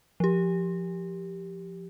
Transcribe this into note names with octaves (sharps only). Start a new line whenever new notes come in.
F3 G4